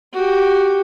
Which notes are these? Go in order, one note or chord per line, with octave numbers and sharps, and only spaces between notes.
F#4 G4